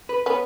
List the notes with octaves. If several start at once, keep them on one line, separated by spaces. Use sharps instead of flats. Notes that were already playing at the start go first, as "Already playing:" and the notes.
B4
B3 C#4 B4